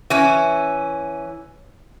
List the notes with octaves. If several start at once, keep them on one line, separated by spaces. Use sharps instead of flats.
E3 C#4